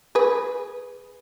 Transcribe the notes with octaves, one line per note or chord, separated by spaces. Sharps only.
G#4 B4